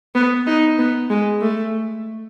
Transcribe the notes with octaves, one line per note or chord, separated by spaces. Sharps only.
B3
D#4
B3
G#3
A3